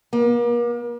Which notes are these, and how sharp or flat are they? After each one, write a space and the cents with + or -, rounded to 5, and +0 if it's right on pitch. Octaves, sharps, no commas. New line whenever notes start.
A#3 +40